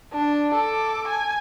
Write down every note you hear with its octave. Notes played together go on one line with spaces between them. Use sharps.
D4
A4 D6
G#5